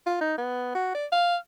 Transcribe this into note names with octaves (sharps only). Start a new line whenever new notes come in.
F4
D#4
B3
F#4
D5
F5